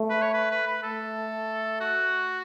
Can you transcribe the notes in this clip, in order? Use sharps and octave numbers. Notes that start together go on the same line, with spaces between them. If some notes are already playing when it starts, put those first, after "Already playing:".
Already playing: A3
B4
C#5
B4
B4
B4
A3 A4
F#4